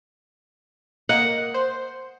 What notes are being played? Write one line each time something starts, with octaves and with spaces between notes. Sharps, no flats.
A#3 D#5 F#5
C5